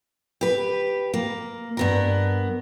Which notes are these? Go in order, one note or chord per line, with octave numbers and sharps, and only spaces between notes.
G4 B4
A#3
G2 B3 A#4